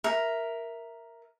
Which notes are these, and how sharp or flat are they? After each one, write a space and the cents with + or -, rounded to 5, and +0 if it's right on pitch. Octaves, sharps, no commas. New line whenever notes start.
A#4 +0 E5 +0